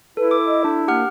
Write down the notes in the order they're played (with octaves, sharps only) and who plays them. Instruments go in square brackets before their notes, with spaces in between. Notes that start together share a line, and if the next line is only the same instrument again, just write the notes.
[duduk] E4 [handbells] A4 [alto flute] B4
[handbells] D6
[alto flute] D#5
[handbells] D4 [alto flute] A4
[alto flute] A#3 [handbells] G4 F#5 F6